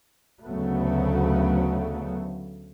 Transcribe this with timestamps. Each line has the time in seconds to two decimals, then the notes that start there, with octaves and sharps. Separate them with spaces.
0.44 D2 C#3 F#3 A3 B3